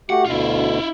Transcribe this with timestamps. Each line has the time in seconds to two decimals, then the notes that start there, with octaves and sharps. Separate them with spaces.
0.10 A3 F#4 G4 F#5
0.26 D2 B2 E4 F4